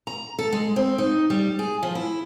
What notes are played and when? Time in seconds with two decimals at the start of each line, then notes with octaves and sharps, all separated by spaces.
0.07 A#5
0.39 A4
0.52 G#3
0.76 C4
0.98 D#4
1.30 G3
1.59 G#4
1.83 F3
1.95 E4